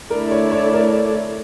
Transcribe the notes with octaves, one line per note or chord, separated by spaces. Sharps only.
D3 A3 E4 A4 A#4 D5
C#5
C#5
A#4